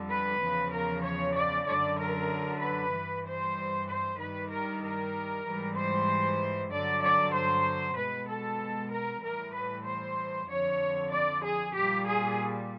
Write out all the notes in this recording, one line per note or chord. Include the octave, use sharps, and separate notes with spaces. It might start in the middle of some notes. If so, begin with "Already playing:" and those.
Already playing: F2 D3 G3
B4
E2 C#3 F3
A#4
C#5
D5
F#2 D3 F#3 D5
A#4
B4
G2 E3 G3
C5
C5
G2 D#3 G3 B4
A#4
A#4
G#2 E3 G3
C5
G2 D3 F#3 D5
D5
C5
B2 G#3 B4
A4
A#4
A2 E3 G3 A#4
B4
C5
F2 D3 F3 C#5
D5
G#4
A#2 G3 G4
G#4